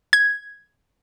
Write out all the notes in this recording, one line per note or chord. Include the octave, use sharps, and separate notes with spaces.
G#6